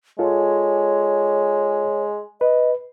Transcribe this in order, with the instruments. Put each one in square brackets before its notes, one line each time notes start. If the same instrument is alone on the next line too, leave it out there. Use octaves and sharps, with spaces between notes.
[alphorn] G#3 [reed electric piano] F4 A4 [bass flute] C#5
[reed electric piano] B4 [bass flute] D#5